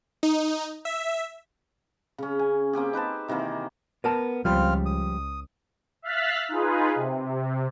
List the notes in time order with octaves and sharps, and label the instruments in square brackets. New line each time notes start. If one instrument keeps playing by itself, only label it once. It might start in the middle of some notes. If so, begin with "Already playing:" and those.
[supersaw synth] D#4
E5
[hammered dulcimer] C#3 C#4
G#5
A#3 C4 G4 G#4
D#4 B4 C5 A5
C3 D#3 E3 A#3
[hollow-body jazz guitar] B3 A#4 A5
[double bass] C#2 [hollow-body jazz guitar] F3 G3 [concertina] C4 F4 F6
[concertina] D#6
[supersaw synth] E5 F5 F6 F#6 A6 B6
D#4 F4 G#4 B4
C3